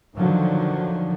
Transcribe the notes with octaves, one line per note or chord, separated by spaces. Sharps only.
D3 D#3 F3 F#3